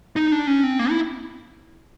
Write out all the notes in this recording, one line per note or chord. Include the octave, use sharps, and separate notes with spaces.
D#4
D4
C#4
C4
A#3
E4